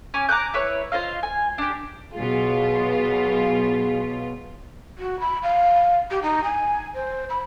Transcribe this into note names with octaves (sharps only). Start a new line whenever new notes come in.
C#4 G#5 D6
A#5 D6 F#6 G6
E4 B4 C#5
F4 C5 D#5 F5
G#5
D4 G4
B2 F#3 F4 G#4
F#4
B5
F5
G4
D#4
G#5
C5
B5